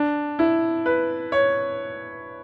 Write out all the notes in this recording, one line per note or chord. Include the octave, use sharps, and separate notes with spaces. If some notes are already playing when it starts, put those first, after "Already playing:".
Already playing: D4
E4
B4
C#5